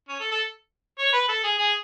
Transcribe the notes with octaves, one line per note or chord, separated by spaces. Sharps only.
C#4
A4
A4
C#5
B4
A4
G#4
G#4